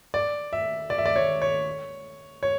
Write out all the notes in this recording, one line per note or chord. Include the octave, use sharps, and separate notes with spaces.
D5
E5
D5
E5
D5
C#5
C#5
C#5